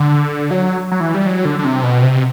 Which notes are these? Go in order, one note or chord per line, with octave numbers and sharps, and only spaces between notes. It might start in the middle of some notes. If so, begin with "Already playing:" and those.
Already playing: D3
F#3
F#3
E3
G3
F#3
D3
D3
C3
B2
C3